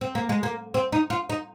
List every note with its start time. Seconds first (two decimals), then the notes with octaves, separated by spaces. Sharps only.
0.01 C4
0.15 A#3
0.29 G#3
0.43 A#3
0.74 C4
0.92 D#4
1.10 F4
1.29 D#4